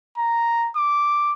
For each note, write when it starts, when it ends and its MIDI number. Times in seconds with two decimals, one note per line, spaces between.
0.18 0.69 82
0.76 1.33 86